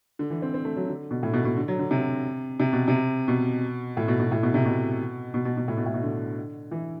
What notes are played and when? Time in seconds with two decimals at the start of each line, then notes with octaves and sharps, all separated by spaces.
0.19 D3
0.30 E3
0.42 C4
0.54 C4
0.65 A3
0.76 F#3
0.88 D3
1.11 B2
1.23 A2
1.34 B2
1.45 B2
1.57 D3
1.68 F#3
1.79 D3
1.91 C3
2.60 C3
2.73 B2
2.88 C3
3.28 B2
3.97 A2
4.08 B2
4.20 B2
4.32 A2
4.43 B2
4.54 C3
4.65 B2
5.34 B2
5.45 B2
5.57 B2
5.68 A2
5.77 B2
5.86 A2
5.94 B2
6.03 D3
6.71 E3